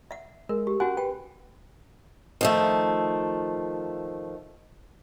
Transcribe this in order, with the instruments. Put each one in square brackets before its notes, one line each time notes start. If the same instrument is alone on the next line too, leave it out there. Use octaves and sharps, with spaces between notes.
[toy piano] E5 F#5
[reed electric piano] G#3 [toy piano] A#4
[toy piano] G4
[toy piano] C#4 F#4 G#5 [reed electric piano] F#5
[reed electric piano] B4 [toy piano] G5
[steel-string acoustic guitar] D#3 F3 A3